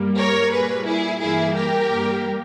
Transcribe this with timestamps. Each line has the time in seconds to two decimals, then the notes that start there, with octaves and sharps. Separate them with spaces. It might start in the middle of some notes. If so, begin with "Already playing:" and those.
Already playing: G2 G3 A#3
0.18 A#4 C#5
0.52 A#2 G3 A#3 G#4 B4
0.86 E4 G#4
1.21 G2 E3 A#3 E4 G#4
1.55 G4 A#4
1.90 G2 G3 A#3